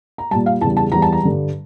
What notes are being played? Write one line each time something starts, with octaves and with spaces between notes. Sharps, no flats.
A#5
A#2 G3 A5
F5
E2 C#3 G3 A5
A5
E2 E3 G3 A#5
A5
A#5
G2 D3 G3